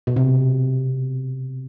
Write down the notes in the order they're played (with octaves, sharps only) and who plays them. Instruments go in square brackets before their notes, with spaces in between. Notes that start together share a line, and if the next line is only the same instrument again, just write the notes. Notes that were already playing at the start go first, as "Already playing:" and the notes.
[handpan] B2
C3